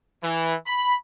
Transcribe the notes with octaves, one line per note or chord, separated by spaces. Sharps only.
E3
B5